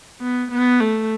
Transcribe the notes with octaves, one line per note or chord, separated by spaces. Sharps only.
B3
B3
A3